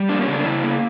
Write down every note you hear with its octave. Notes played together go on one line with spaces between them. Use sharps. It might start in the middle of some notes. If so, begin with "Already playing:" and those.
Already playing: G3
A#3 D4
C#4
C#3 D4
C#3 E4
A#3